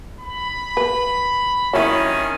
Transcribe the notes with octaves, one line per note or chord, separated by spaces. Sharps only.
B5
B4
C3 D#3 F#3 C#4 E4